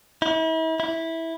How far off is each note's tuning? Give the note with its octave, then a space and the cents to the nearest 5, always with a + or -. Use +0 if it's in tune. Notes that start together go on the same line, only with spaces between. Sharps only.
E4 -40
E4 -10